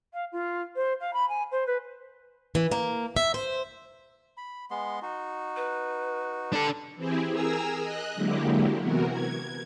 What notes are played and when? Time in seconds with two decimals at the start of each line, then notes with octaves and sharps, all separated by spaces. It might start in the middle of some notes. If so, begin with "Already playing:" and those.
0.13 F5
0.31 F4
0.75 C5
1.00 F5
1.13 B5
1.28 G#5
1.51 C5
1.66 B4
2.55 E3
2.71 A#3
3.16 E5
3.34 C5
4.37 B5
4.71 G#3 B3 C6
5.02 D#4 F#4
5.56 B4
6.53 G3 D4 A4
6.96 E3 C4 E4 G4 G#4
7.31 G#4 A#4 G#5 A#5 E6
7.81 D#5 F#6
8.15 D3 F#3 G#3 A#3 E4 G4
8.79 C3 E3 B3 F#4 A#4
9.10 G#6